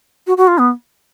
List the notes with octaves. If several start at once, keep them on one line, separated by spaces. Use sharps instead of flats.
F#4
F#4
F4
B3